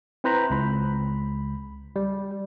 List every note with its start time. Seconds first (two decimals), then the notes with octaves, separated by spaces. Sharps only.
0.24 C4 E4 B4 C5 A#5 B5
0.50 C#2 B5
1.96 G3